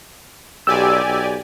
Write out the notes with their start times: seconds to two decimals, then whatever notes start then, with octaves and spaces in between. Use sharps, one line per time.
0.67 B1 G4 D5 G#5 E6
1.05 B1